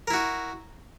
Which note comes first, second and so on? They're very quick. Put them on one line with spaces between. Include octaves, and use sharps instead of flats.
A#4 E4 F#4